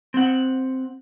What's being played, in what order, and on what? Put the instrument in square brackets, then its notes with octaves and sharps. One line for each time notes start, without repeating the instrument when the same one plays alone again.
[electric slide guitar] C4 F#5